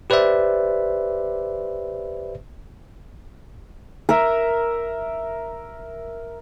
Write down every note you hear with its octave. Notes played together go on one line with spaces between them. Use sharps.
G4 B4 C5 D5 E5
A#4 E5